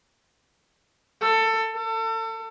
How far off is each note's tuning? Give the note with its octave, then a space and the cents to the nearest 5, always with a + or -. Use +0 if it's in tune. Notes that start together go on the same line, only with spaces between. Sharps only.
A4 +20
A4 +35